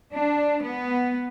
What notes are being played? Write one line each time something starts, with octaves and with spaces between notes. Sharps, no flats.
D4
B3